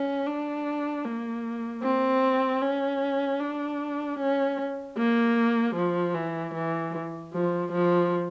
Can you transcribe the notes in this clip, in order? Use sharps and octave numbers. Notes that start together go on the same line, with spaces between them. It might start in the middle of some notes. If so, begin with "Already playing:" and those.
Already playing: C#4
D4
A#3
C4
C#4
D4
C#4
A#3
F3
E3
E3
F3
F3